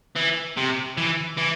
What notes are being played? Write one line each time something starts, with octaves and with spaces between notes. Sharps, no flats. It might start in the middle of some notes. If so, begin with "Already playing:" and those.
E3
C3
E3
E3